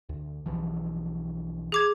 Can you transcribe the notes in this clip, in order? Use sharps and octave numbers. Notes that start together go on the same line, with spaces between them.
D2
B1 E3 F3
G#4 D6 G#6